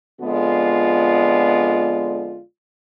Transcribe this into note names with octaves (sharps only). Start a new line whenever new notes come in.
F2 D3 G#3 B3 F4 D5